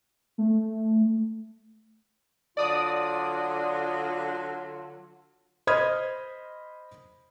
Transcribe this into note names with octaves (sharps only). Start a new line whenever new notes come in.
A3
D3 F#3 F4 D5 D#6
C5 D#5 B5 D#6 F6 G#6